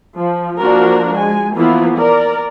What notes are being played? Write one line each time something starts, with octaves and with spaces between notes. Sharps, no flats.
F3
F3 A#3 D4 F#4 A#4
G#3 G#5
E3 F3 A#3 B3 E4 F4
A#4 D5